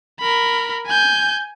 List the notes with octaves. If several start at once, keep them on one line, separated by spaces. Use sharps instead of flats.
A#4 B5
G#5 G6